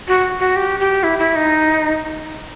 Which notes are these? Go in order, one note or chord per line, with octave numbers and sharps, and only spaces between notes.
F#4
F#4
G4
G4
E4
E4
D#4